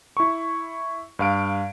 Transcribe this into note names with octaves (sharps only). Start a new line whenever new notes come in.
E4 C#6
G2 F5 D7